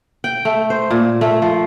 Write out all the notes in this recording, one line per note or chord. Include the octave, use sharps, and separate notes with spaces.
G5
A3
C5
A#2
A3
F3